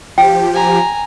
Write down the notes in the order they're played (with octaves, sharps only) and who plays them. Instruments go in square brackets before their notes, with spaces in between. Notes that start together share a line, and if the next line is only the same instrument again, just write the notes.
[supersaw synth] F3 G4 [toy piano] G5
[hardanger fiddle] G#5 A#5